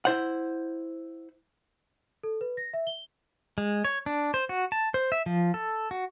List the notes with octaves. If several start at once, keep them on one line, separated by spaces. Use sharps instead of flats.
E4 C5 F#5
A4
B4
A#6
E5
G7
G#3
C#5
D4
C5
F#4
A5
C5
E5
F3
A4
F#4